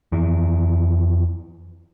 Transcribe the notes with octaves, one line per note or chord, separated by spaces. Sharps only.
F2 E3